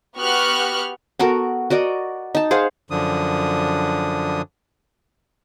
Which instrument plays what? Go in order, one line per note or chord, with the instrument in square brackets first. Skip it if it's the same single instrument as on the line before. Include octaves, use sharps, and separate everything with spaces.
[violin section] B3 F#4 G4 C#6 F6 F#6
[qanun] B3 F#4 A4 A#4
F#4 A#4 D5 D#5
D#4 A5
G#4 C5 F5 F#5
[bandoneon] F#2 D3 F3 D4 D#6